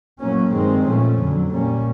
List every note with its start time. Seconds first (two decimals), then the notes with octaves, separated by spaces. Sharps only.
0.20 A2 F#3 A#3 C#4
0.53 G2 D#3 G#3 C4
0.86 A#2 F3 A3 C#4
1.18 F2 D3 F#3
1.52 A#2 G3 A#3 C#4